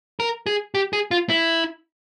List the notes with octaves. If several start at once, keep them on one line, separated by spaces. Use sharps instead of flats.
A#4
G#4
G4
G#4
F4
E4